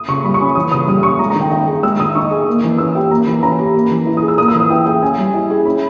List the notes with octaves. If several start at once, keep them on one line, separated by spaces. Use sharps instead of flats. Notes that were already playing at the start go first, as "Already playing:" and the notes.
Already playing: D#6
C#3 C#6
G3 B5
C#6
C#4
E3 D#6
C#3 D#6
G3 D#6
C#4 C#6
G#3 A#5
A#5
D#3
G5
D#4 G5
G#4
G#3 E6
D#3 D#6
D#4 C#6
G#4
A#3
E3
C#4 E6
G4 G5
A#3 A#5
E3 B5
C#4 A#5
G4
A#3
E3
E4
D#6
G#4
E6
A#3 D#6
E6
E3
D#6
E4 G5
G#4 G5
C#4 G#5
G3
E4
G#4
C#4 B5